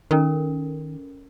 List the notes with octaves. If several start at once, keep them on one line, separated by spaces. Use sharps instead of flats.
D#3 C#4 A4 A#4